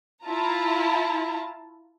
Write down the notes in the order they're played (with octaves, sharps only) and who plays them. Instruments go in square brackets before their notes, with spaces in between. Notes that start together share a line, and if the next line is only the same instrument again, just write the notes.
[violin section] E4 F4 A5 A#5